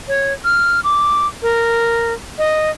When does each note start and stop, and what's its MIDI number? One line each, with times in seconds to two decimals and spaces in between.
0.08 0.33 73
0.45 0.80 89
0.84 1.27 86
1.42 2.13 70
2.38 2.70 75